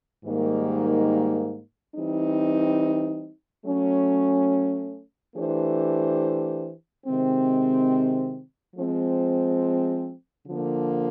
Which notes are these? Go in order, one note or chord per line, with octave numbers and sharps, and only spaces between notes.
G#2 D#3 G3 A#3 D#4
E3 G3 C4 D#4
F#3 A3 C#4
E3 A3 D4 G4 C5
C3 D#3 G#3 C4
F3 G#3 C4
D3 F3 A#3